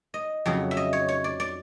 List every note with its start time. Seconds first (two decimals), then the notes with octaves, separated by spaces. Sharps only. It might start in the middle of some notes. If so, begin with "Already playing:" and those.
0.14 D#5
0.46 F2 C#3 F#3
0.71 E5
0.77 D#5
0.93 C#5
1.09 C#5
1.24 D5
1.40 D5